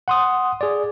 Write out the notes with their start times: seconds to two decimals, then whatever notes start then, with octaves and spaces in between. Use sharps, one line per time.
0.08 F#5 C6 D#6
0.61 G#4 D5